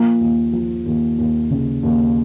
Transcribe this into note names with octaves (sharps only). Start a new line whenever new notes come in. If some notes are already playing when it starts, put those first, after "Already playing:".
Already playing: F3 A#3
D#2
F3
D#2
D#2
C#3
D#2